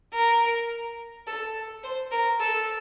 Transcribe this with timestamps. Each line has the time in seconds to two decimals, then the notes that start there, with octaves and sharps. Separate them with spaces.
0.14 A#4
1.27 A4
1.84 C5
2.11 A#4
2.40 A4